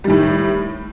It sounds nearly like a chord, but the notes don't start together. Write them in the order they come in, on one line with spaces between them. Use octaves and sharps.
G3 D#3 A2